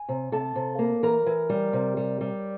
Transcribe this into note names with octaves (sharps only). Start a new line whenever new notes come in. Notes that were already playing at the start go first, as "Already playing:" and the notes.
Already playing: G#5
C3
C3 A4 A5
C3
A#3
E3 A#4 A#5
E3
G3
C3
G3
G3